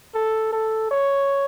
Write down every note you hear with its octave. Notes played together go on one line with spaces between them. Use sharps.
A4
A4
C#5